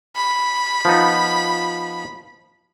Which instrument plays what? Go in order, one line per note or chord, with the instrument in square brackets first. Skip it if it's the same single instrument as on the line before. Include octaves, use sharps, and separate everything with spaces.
[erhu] B5
[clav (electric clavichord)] F3 B3 D#4